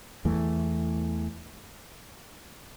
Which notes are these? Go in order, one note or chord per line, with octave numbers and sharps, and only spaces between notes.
E2 E3 A3